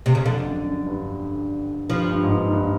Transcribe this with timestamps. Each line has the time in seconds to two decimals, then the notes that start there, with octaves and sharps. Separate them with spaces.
0.06 C3
0.15 C#3
0.25 F2 D3
0.46 F#2
0.66 F#2
0.86 G2
1.90 G2 F3
2.10 G2
2.23 G#2
2.30 G2
2.47 G#2
2.51 G2